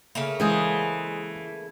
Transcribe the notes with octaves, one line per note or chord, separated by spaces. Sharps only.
C#3 A3 A#3
E3 G#3 G#4 C5 D#5